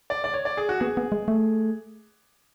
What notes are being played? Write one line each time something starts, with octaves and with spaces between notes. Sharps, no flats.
D5
D5
C#5
D5
G#4
F#4
B3 G#4
B3
G#3
A3